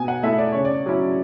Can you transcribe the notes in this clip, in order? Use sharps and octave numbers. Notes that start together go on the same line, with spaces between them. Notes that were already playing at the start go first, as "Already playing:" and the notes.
Already playing: B2 G#5
F#5
A3 E4 E5
D5
C#3 C#5
D5
F#3 C#4 E4